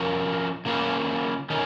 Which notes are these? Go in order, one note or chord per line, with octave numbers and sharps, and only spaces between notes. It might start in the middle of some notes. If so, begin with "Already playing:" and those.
Already playing: F3 C#4 A#4
C#3 A#3 C#4 F4
D#3 C#4